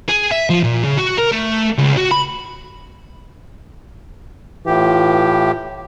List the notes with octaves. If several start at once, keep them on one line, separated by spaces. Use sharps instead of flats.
G#4
E5
F3
A#2
C#3
F#4
A#4
A3
C#2
F#4
B5
A2 E3 F4 G4